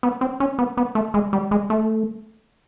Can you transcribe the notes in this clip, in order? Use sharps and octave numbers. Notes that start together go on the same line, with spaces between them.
B3
C4
C#4
B3
B3
A3
G#3
G3
G#3
A3